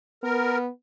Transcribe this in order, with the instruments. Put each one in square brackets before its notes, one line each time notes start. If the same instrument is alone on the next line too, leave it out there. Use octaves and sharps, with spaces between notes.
[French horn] B3 [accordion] A#4